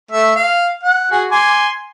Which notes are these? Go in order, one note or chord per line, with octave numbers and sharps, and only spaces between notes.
A3 E5
F5
F#5
F#4 G#4
G#5 C6 D6